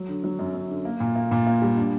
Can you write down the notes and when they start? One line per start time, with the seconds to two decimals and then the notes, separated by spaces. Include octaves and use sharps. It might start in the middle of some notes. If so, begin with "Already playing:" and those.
Already playing: F#3
0.09 D3
0.24 F#3
0.39 F#2
0.55 F#2
0.69 D3
0.85 A#3
1.00 A#2
1.16 A#3
1.31 A#2
1.46 A#3
1.62 G3
1.77 D4